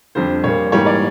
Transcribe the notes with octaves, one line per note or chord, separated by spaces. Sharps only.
F2 D3 G3 C5
A#2 G3 A#3 C#5
G#2 E3 G3 A#3 C#5
D5